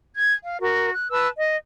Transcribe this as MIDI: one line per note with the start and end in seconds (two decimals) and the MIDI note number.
0.15 0.33 92
0.43 0.58 77
0.60 0.91 66
0.60 0.91 70
0.92 1.06 90
1.11 1.28 71
1.11 1.28 81
1.11 1.28 88
1.11 1.28 90
1.39 1.55 75